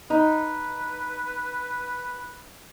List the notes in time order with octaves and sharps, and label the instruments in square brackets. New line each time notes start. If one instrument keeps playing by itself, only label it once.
[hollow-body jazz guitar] D#4 [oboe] B4